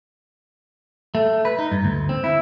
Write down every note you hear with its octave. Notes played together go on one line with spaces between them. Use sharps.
A3
B4
D#4
G2
D2
C4
E4